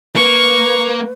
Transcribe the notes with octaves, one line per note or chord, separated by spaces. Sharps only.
A#3 B4 C#6